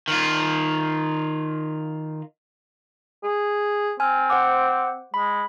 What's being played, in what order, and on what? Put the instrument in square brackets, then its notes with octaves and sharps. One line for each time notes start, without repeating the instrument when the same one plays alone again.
[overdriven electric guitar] D#3 F4
[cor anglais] G#4
[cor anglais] C4 [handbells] G#5 F6
[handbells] C5 F#5 D6
[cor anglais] G#3 [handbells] B5